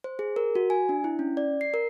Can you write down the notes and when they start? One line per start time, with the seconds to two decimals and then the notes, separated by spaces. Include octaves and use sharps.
0.04 C5
0.19 G#4
0.36 A#4
0.55 F#4
0.70 G#5
0.89 D4
1.04 E4
1.19 C#4
1.37 D5
1.61 C7
1.74 A#4